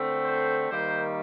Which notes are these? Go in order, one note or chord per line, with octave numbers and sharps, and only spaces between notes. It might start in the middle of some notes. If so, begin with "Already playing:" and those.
Already playing: D3 A3 C4
C5
D#3 G3 A#3 C5